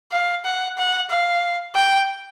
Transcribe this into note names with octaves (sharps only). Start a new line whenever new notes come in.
F5
F#5
F#5
F5
G5